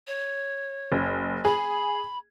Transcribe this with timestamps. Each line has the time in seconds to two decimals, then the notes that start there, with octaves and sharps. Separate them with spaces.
0.07 C#5
0.92 F#1
1.45 G#4 B5